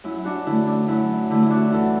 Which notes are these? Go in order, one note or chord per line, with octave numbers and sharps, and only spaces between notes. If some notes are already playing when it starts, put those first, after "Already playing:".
F#2 E4
D4 F#4
D3 A3 E4
D4
F#2 E4
D3 A3 E4
E4
D4 F#4
E2 E4 A4